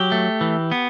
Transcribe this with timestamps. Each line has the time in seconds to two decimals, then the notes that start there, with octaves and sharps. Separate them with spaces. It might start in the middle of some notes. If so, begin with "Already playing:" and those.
Already playing: F#3 G4
0.12 A3
0.41 E3
0.72 B3